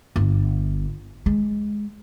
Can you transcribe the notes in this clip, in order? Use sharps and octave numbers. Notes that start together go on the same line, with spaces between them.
G1
G#3